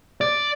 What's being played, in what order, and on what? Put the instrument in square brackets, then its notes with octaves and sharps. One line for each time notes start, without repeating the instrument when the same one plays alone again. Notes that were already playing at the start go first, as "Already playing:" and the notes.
[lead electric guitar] D5